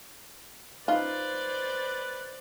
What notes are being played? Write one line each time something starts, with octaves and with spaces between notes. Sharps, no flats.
D#4 F4 B4 C5 D5 F5